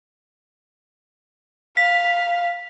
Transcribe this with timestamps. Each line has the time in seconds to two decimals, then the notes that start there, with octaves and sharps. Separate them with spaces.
1.77 F5 B6